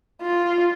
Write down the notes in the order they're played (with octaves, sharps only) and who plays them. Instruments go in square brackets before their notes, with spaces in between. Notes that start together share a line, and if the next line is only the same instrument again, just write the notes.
[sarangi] F4